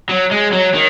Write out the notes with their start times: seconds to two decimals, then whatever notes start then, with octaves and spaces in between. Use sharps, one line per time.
0.09 F#3
0.31 G#3
0.52 F#3
0.74 D#3